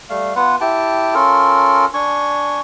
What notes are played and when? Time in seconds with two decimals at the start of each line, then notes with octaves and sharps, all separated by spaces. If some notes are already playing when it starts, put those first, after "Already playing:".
0.09 G3 A3 F5
0.36 B3 F4 B4 F#5
0.61 E4 G4 G5 A5
1.14 C#4 F4 A4 A#4
1.94 D4 G#5 C#6